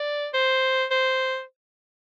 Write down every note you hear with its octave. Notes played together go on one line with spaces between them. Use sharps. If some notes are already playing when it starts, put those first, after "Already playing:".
Already playing: D5
C5
C5